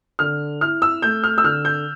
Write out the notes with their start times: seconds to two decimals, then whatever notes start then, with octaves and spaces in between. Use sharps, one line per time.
0.19 D3 F6
0.61 E4 F6
0.82 E6
1.02 A3 G6
1.24 F6
1.38 E6
1.44 D3 F6
1.65 G6